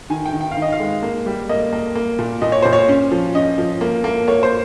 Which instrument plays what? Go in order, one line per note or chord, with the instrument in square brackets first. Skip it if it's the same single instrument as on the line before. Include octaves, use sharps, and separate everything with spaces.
[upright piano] D#3 G#5
G5
D#3
G5
F5
D#3
D#5
F5
G#3
A#3
G3
A#3 D#5
A#3
A#3
A#2
A#2 D#5
C#5
A#2 C5
C#5
C#4
F3
C#4 D#5
F3
A#3
A#3
A#3 C#5
C5